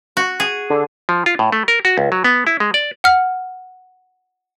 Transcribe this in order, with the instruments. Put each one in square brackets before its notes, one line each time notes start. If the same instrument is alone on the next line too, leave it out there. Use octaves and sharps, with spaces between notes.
[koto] F#4
G#4
[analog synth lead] D3
[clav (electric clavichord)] F3
F4
A2
A3
A#4
F#4
C#2
F#3
B3
E4
G#3
D5
[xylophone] F#5 F6